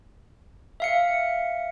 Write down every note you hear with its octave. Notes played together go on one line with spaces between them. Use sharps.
E5 F5 C#7